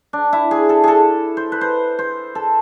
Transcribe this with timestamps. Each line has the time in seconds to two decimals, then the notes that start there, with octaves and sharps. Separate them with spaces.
0.13 D4
0.33 E4
0.51 G#4
0.69 A4
0.84 G#4 A4
1.37 C5
1.52 B4
1.61 C5
1.99 C5
2.35 A4